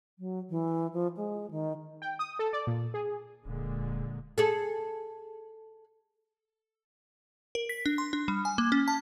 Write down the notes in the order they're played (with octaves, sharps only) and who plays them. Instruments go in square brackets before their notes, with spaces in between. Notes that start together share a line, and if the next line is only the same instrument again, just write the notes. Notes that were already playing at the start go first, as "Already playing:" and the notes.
[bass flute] F#3
E3
F3
G#3
D#3
[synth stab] G5
D#6
A4
D5
A#2
G#4
[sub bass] D1 [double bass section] A#2 D3 G#3
[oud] G#4 A4
[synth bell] A#4
B6
D4
C6
D4
G3
G#5
A#3
C#4
A5